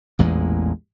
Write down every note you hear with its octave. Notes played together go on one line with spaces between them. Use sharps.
A1 E2 A#2 G#3